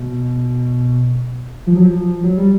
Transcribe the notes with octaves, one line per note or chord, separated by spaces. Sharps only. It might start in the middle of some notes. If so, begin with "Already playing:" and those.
Already playing: B2
F3
F#3
F3
F#3
G3